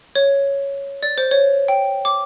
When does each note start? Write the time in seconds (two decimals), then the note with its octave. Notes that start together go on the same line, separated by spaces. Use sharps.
0.15 C#5
1.03 D5
1.18 C5
1.31 C#5
1.68 G5
2.05 D6